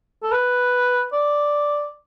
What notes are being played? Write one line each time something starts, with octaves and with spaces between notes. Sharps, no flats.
A4
B4
D5